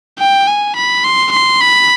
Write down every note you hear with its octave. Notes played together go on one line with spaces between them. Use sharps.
G5
G#5
B5
C6
C6
B5